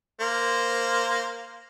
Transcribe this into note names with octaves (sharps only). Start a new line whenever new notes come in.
A#3 C5